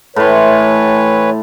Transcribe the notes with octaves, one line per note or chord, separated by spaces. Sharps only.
A2 E3 B4 C#5 C6